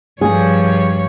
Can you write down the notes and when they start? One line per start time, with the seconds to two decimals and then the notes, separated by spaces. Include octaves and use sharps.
0.21 G2 F3 G#4 C#5